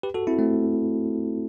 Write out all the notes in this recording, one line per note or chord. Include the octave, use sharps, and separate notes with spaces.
G4 B4
F#4 A4
C4 E4
A3 C4